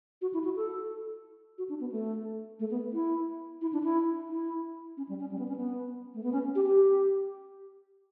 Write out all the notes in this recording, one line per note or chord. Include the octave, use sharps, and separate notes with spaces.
F#4
E4
F#4
A4
F#4
D4
B3
A3
A3
B3
E4
E4
D4
E4
E4
C#4
G3
C#4
G3
B3
C#4
B3
A3
B3
C#4
G4
G4